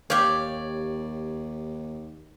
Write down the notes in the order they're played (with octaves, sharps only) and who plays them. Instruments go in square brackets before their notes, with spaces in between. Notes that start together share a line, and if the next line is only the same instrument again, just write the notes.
[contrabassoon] D#2 [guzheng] G4 F5 [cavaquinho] C#5 D5